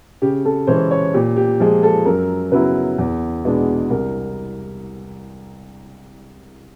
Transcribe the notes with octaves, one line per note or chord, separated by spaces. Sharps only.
C#3 G4
A4
E3 G#3 C#4 C5
C#5
A#2 G4
G4
F3 G#3 G#4
A4
F#2 A#4
C#3 F#3 B3 E4 B4
E2
B2 G#3 B3 D4
C2 A#4